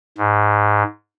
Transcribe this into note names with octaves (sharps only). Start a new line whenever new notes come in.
G#2